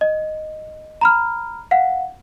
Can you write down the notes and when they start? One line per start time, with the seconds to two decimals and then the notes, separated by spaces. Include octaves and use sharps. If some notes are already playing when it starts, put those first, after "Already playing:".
0.01 D#5
1.01 A#5 B5 F6
1.71 F5 F#5